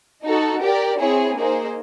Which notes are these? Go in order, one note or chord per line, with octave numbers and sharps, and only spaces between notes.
D#4 F#4 A4
G4 A#4 D5
C4 E4 G#4 C#5
A#3 D#4 G#4 C5